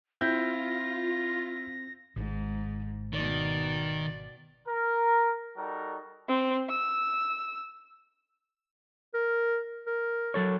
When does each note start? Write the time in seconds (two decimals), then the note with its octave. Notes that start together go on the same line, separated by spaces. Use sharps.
0.21 C4 E4 F4 G6 A#6
2.16 G#1 G#2
3.13 B2 D#3 D5
4.68 A#4
5.57 G3 D#4 F#4 A4 A#4
6.28 C4
6.69 E6
9.14 A#4
9.87 A#4
10.34 F#3 A4 C#5